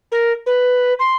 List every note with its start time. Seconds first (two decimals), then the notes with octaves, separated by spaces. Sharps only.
0.11 A#4
0.46 B4
0.99 C6